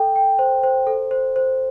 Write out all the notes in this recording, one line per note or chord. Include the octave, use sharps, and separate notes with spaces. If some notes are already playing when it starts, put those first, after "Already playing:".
Already playing: A4 G5
G5
C5
C5
A4
C5
C5